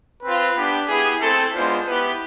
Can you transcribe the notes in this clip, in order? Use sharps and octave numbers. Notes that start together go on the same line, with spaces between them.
C4 F4 B4
B3 D4 G4
B3 E4 G4 G#4
A3 C4 E4 A4
G#3 B3 D4 F4 C5
B3 E4 G4 B4